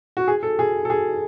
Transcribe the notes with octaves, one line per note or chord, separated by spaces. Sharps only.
F#4
G#4
A4
G#4
A4
G#4